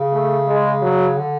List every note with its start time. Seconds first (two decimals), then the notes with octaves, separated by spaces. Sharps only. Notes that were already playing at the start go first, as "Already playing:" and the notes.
Already playing: C#3
0.12 A3
0.47 G#3
0.82 F#3
1.17 D3